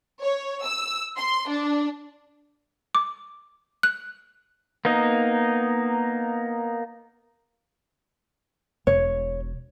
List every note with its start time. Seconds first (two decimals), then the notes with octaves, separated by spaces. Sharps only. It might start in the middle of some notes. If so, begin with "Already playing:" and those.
0.23 C#5
0.64 E6
1.18 C6
1.50 D4
2.95 D6
3.83 F#6
4.85 A#3 B3 D#4
8.87 E1 C#5